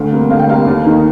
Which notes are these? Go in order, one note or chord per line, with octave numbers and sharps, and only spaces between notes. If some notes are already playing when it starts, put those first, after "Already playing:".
Already playing: D2 F5
C3 G3 A#3
D2 F5
G5
C3 G3 A#3 F5
D#2
D#3 A#3